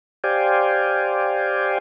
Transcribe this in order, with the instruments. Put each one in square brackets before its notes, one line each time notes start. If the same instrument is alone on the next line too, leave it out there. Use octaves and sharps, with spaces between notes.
[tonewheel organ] G4 C5 D5 F5 G5 G#5